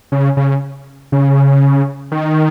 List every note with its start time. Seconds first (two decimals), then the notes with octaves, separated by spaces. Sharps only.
0.12 C#3
0.37 C#3
1.12 C#3
2.12 D#3